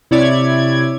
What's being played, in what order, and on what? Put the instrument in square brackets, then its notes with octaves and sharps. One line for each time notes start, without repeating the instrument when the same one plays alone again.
[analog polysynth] C3 E4 C#5 D5 G#6